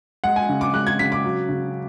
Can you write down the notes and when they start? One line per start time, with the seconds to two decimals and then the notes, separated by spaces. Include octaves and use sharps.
0.24 G#3 F#5
0.36 G#5
0.49 C#3
0.61 D6
0.74 G#3 F#6
0.87 G#6
0.99 C#3 B6
1.12 D6
1.24 F#3
1.49 C#3